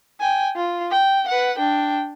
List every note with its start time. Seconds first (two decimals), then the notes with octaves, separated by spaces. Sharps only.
0.20 G5 G#5
0.56 F4
0.91 G5
1.28 B4 F#5
1.58 D4 G5